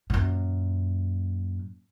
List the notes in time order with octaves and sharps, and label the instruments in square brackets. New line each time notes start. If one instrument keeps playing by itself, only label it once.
[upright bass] F#2 A#2